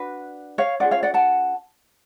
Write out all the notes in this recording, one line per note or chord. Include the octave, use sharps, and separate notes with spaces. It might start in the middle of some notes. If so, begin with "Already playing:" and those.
Already playing: D4 F#4 B4
C#5 F5
C#4 F4 G#4 D5 F#5
C#5 F5
D5 F#5
F#5 A5